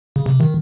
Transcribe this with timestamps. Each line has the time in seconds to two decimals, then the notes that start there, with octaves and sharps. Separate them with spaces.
0.16 C#3
0.26 C3
0.41 D#3